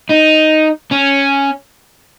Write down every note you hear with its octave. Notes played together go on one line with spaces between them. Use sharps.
D#4
C#4